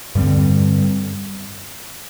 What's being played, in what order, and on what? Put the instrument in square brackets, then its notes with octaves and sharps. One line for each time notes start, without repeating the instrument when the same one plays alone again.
[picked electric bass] G2 D3 G3 C4